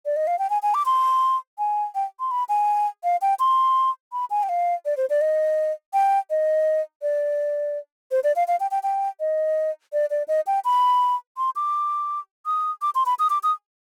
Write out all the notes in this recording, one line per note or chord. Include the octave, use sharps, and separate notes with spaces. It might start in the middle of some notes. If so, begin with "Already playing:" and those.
D5
D#5
F5
G5
G#5
G#5
D6
C6
G#5
G5
C6
B5
G#5
F5
G5
C6
B5
G#5
G5
F5
D5
C5
D5
D#5
G5
D#5
D5
C5
D5
F5
F5
G5
G5
G5
D#5
D5
D5
D#5
G5
B5
C6
D6
D#6
D6
C6
B5
D#6
D6
D#6